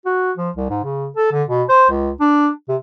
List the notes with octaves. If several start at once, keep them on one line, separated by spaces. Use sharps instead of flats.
F#4
F3
C2
G#2
C#3
A4
D3
B2
C5
C#2
D4
C3